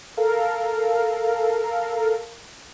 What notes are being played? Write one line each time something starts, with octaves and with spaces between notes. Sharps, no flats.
A4 A#4 F5